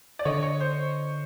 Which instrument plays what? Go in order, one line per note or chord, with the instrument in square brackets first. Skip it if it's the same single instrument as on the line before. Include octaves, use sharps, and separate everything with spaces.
[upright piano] D5
[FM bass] D3 [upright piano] C#5 D#5
[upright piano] C#5
C5